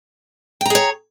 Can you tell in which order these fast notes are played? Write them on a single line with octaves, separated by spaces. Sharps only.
G5 A#5 G#4 C#5